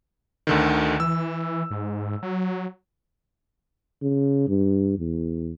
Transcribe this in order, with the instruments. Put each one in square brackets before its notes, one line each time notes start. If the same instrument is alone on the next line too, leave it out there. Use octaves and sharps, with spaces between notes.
[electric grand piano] D2 D3 D#3
[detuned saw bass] E3 [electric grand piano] E6
[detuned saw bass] G#2
F#3
[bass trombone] C#3
G2
E2